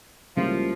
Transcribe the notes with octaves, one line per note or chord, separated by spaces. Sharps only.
C#2 C#3 F3 G3 A#3 E4